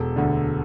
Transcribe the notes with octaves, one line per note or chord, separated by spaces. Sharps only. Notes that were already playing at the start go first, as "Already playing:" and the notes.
Already playing: E1 A4
D2 D3